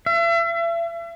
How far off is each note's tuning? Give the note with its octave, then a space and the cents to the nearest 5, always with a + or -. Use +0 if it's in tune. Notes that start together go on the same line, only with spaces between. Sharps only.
E5 +40